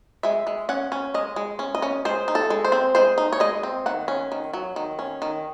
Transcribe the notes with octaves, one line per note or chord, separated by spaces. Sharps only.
G#3 E5
G#3
C#4 F#5
C#4
G#3 D#5
G#3
C#4
D#5
C#4
G#3 C5
D#4
A4
G#3
C5
C4
G#3 C5
D#4
C#5
G#3 D#5
C4
D#3 F#5
C#4
D#3
F#3
D#3
C#4
D#3